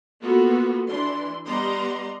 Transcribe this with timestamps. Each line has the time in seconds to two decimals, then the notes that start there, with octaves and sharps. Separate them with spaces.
0.21 A#3 B3 F4 F#4 A4
0.86 E3 D4 C6
1.46 G3 B3 D5 D#5 A#5 C6